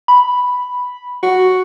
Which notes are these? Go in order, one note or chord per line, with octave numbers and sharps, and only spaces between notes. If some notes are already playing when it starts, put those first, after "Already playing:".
B5
F#4